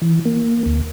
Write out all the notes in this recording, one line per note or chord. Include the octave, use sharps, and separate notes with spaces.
E3
A#3
D2